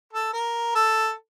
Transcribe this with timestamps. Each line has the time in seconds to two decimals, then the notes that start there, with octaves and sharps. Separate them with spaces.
0.13 A4
0.33 A#4
0.75 A4